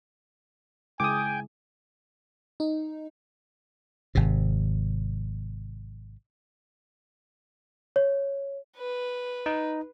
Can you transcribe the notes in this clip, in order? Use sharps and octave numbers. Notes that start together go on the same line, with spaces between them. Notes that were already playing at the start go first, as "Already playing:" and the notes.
C#3 G#3 E4 G5 G#5 D6 D#6
D#4
G#1 C3
C#5
B4
D#4